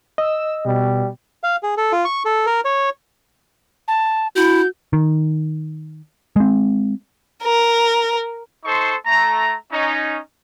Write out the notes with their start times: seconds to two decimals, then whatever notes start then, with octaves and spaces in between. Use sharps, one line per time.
0.18 D#5 E6
0.65 B2 G3
1.43 F5
1.63 G#4
1.77 A4
1.92 F4
2.05 C#6
2.25 A4
2.46 A#4
2.65 C#5
3.88 A5
4.36 E4 F#4 G6
4.93 D#3
6.36 G#3 C4
7.43 A#4
8.64 D#4 A4 C5 C6 C#6
9.05 A3 A#5
9.72 C#4 D#4